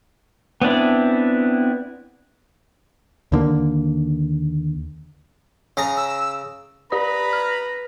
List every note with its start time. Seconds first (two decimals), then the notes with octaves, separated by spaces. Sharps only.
0.62 B3 C4 D4 E4
3.32 D#2 D3 A#3
5.77 C#3 A#5
5.97 E6
6.92 G4 B4 D5 A#5 B5 D#6
7.33 F6